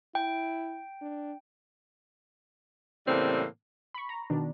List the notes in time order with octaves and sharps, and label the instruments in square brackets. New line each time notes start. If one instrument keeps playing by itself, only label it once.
[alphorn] E4 [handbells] G5
[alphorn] D4
[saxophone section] A2 C#3 E3 G3 A#3 C4
[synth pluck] B5 C#6
A#5
B2 D#3 D4